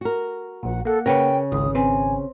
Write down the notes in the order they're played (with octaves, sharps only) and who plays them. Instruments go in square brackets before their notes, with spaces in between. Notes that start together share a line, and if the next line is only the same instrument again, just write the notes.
[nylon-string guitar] F#4 A#4
[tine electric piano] A#1 A#2 [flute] F#5
[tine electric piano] A#3 F#5 [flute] A4
[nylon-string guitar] C#3 [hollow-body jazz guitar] A#4 B4 C#5 [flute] G5
[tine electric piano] G#1 [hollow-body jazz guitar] C#2 [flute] D#6
[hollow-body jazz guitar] C4 B4 [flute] G#5